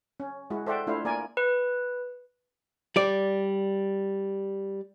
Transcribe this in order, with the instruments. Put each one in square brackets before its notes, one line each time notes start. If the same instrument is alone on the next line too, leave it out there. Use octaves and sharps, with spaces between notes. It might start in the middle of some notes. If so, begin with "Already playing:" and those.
[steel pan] C#4
G#3 E4 F#4
A4 C5 D5 E5 F#5 G5
A3 D4 E4 F4 C5 F5
A#3 A#4 D5 G#5
[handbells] B4
[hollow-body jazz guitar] G3 D5